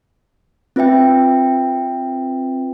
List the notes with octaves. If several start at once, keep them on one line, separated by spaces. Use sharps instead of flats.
C4 F4 B4 E5 G5